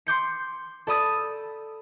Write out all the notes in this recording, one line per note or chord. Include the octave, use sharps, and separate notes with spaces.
C6 D6 G6 C#7
A4 D5 B5 D#6 E6 A6